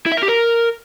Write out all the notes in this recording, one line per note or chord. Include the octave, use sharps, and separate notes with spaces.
E4
E5
A#4
G4
A#4